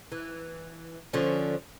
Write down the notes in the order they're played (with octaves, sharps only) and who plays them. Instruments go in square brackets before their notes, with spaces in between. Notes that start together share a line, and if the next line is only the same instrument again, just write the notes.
[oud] E3
D3 F3 C#4